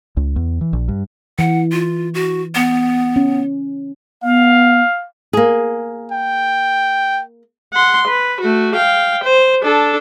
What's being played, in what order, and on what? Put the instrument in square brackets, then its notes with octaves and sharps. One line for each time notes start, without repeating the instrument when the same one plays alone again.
[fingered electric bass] C#2
E2
E3
A#1
G2
[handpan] E3 [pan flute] F#5
[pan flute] F4
F#4
B3
[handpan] C#4
[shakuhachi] B3 [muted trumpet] F5
[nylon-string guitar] A#3 G#4
[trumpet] G5
[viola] F#5 C6
B4
A3 F#4
F5 G5
C5
D4 A4